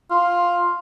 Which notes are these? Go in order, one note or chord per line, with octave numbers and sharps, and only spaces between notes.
F4